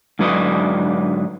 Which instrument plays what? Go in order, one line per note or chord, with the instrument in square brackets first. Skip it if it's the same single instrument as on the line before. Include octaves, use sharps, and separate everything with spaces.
[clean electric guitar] G#2 D3 F#3 B4 D5 D#5